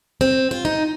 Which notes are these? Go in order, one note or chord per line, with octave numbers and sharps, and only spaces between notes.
C4
F4
D#4